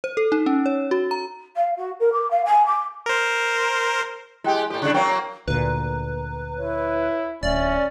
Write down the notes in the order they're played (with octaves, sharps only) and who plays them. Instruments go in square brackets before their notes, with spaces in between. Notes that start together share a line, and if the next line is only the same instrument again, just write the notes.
[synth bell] C5
A4
D#4
C#4
C#5
F#4
A#5
[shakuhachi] F5
F#4
A#4
D6
F5
G#5
D6
[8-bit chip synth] A#4 C5
[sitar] G#3 G4 [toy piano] E4 G5 C6
[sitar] A2 G4 [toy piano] A4
[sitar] C#3 G3 D4
[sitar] F#3 A#3 C4 [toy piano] C#5 G5 C#6
[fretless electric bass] D2 A#2 [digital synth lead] B4 [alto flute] A#5
[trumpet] E4 [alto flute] C#5
[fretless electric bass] D1 [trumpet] C#4 [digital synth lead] D5 [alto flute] E5